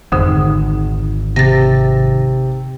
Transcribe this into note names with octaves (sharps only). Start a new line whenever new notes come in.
G#1 F2 D3
C3 A6 A#6